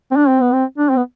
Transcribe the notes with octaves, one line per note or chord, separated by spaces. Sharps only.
C4
D4
C4
B3
C4
D4
C4
B3